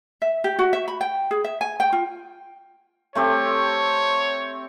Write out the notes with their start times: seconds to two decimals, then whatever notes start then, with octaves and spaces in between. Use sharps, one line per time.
0.22 E5
0.44 G4
0.59 F#4
0.73 E5
0.88 B5
1.01 G5
1.31 G#4
1.44 E5
1.61 G#5
1.80 G5
1.93 F4
3.15 A3 C4 G4 C#5